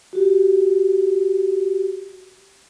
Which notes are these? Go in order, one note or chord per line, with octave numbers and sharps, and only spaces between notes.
F#4 G4